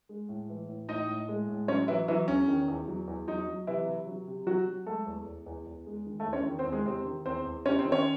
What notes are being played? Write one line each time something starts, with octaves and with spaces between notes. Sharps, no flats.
G#3
A2
E3
A2
A2 D#4 D#5
A2
G#3
A2
F#3 C#4 C#5
E3 F#3 E4
E3 F#3 E4
E2 C#4
D#3
E2
F#3
E2
F#3 D#4
F#3
C3 E3 E4
C3
F#3
C3
F#3 F#4
F#3
G#3 A3 A4
E2
E2
E2
E2
G#3
D#3
A3 A4
E2
C#4 C#5
D#3
C4 C5
E2
G#3 G#4
C3 C4 C5
D#3
E2 C4 C5
E2
C3 C#4 C#5
C4 C5
D#3
C#4 C#5